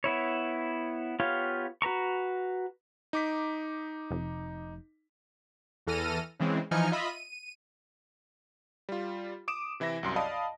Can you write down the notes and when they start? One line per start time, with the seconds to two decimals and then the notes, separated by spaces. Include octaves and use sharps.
0.04 B3 E4 C#5
1.20 B3 F4 G4 C#5 F5
1.82 F#4 B4 A#5 C#6
3.13 D#4 D6 B6
4.11 F1
5.87 E2 E3 A4 F6 A#6 D#7
6.39 C#3 E3 G#3 C4
6.71 E3 F3 D#4 G#5 F6 C#7
6.92 F4 D#5 E5 B5
7.08 D#7
8.89 G3 F4
9.48 D6 D#6 D7 E7
9.80 C3 E3 E4 E5 A#6
10.03 C2 F#2 C6
10.16 D5 D#5 F5 A5 B5 D#6